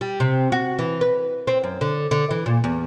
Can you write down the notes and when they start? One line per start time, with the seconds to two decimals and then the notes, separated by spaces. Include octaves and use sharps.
0.01 G3
0.20 C3
0.52 F#4
0.79 E3
1.01 B4
1.47 C4
1.64 F#2
1.81 D3
2.11 D3
2.31 E3
2.46 A#2
2.64 E2